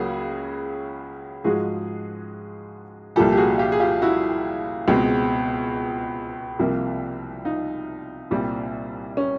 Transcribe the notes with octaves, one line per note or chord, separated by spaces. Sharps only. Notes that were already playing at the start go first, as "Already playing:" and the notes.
Already playing: C#2 C#3 F#3 A#3 F#4 G#4
G#2 F3 G#3 F#4 G#4
C2 A#2 F3 A#3 G4 A4
G4
F#4 G#4
F4 G4
G#4
F4 G4
E4 F#4
C#2 B2 G#3 C4
C2 C3 F3 A#3
D#4 F4
C2 A#2 G3 C4
C#4